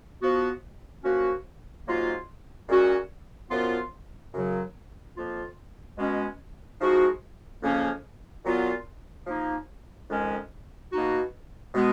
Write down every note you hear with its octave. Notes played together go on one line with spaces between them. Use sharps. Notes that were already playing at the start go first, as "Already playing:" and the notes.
F3 B3 F#4
F#2 F3 A#3 C#4 F#4
G#2 F#3 A#3 F4
A#2 G#3 C#4 F#4
F#2 F3 B3 F4
F#2 C#3 F#3
F2 F3 A#3 F4
B2 G#3 C#4
F3 G#3 D#4 F#4
F2 C#3 F3 A#3 C#4
A#2 F#3 B3 F4
F3 A#3 D#4
F2 D#3 G#3 C#4
B2 A#3 D#4 F#4
B2 G#3 B3